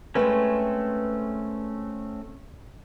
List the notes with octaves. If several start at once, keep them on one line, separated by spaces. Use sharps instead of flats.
G#3 A3 C4 C#4 B4